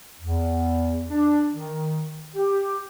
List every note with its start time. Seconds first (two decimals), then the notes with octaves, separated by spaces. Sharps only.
0.20 E2
1.10 D4
1.52 D#3
2.36 G4